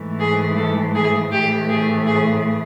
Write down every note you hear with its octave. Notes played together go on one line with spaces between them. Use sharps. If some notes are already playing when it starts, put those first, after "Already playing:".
Already playing: G#2 E3 A3
G#4
A4
G#4
A2 E3 A3 G4
G#4
G#4